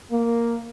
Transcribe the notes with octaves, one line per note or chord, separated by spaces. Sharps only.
A#3